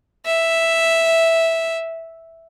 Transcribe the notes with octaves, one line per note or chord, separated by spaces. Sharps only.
E5